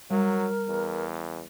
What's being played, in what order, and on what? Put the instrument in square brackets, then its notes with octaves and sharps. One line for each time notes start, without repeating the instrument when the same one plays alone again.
[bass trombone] F#3 [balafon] G3 [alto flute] A#4
[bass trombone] E2